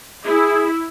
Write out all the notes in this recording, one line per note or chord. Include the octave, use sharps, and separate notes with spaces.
E4 G#4